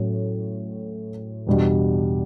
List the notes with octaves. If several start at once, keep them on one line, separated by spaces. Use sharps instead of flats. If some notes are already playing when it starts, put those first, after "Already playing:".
Already playing: A2 F#3 C#4
E2 B2 G3 D4 G4